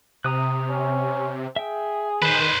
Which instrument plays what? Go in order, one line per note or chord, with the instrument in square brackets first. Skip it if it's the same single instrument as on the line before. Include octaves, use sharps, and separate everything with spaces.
[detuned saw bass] C3 [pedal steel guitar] A#5 D#6 F#6
[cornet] C#4
[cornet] G#4 [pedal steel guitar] E5 G5
[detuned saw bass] D#3 [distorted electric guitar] B4 C5 [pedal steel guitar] B5